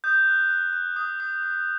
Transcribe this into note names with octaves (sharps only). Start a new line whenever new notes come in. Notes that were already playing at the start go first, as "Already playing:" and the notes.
D#6 G6
F#6
F#6
F#6
D#6
D#6
D#6